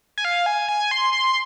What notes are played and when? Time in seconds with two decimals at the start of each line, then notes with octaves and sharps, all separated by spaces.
0.18 G#5
0.25 F5
0.46 G#5
0.68 G#5
0.91 C6
1.13 C6